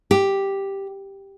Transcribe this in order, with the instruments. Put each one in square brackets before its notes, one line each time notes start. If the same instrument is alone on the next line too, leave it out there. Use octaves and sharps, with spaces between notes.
[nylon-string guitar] G4